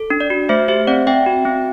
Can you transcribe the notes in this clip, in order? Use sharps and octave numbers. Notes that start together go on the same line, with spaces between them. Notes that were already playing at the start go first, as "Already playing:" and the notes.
Already playing: A4
D4
D5
F#4
A3 C5 E5
G4 C5 E5
C4 D5 F#5
C4 E5 G5
F#4
C4